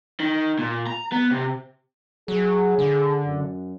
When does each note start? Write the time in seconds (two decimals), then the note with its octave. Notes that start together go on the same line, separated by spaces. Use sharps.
0.20 D#3
0.59 A#2
0.87 A#5
1.12 B3
1.31 C3
2.28 F#3 G#4
2.78 D3
3.26 F#2